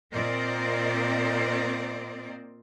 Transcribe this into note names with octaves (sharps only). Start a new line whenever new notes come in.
A#2 C4 A#4 C5 D5 D#5